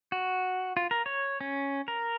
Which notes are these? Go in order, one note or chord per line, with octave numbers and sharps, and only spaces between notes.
F#4
F4
A#4
C#5
C#4
A#4